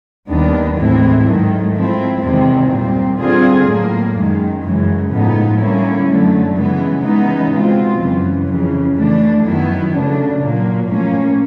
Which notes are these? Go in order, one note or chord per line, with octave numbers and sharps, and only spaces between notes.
D#2 D#3 G3 B3 D4
A2 E3 G#3 C4 E4
G#2 D#3 F#3 A3
F3 G#3 C4 E4
E2 C3 D#3 G#3 C4
A#2 G3 C4
D3 G3 C4 F4 G#4
A2 F#3 A#3
F#2 D#3 G#3
F#2 C#3 E3 G#3
A2 F3 G#3 B3 D#4
D3 G3 A#3 C#4 E4
F#2 D3 F#3 A3
C#3 E3 G#3 B3
C#3 E3 G#3 B3 D#4
B2 G#3 C4 F4
F#2 C#3 E3
F2 C#3 E3
E3 A3 D4
F#2 D#3 F#3 B3 E4
C#3 F#3 A3 D4
A#2 F#3 A#3
A2 F3 A#3 C#4